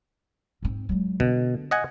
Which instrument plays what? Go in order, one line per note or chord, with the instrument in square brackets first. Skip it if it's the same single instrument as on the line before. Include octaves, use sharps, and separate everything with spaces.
[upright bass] G#2 C4
F#3 G#3
[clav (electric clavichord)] B2 [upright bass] D3
[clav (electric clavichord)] D#5 F#5 G#5